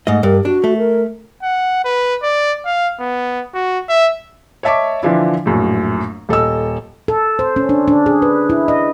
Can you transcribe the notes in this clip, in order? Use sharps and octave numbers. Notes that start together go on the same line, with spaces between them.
G#2 A3 D#5
G2 A#4
D4 F#4
A3
A#4
F#5
B4
D5
F5
B3
F#4
E5
C#5 D#5 E5 A5 C#6 D6
D3 E3 F3 D4 E4
A#1 F#2 A2
D#1 A4 D#5 E6
A4
C5
C#4
D4
D4
G#4
B4
E4
D#5